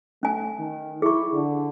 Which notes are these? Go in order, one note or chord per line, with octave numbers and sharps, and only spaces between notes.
A3 C#4 G#5
D#3
E4 G#4 C#6
D3